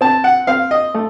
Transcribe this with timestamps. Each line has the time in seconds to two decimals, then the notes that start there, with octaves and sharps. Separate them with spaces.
0.01 C4 A5
0.24 F#5
0.47 C4 F5
0.71 D#5
0.94 A3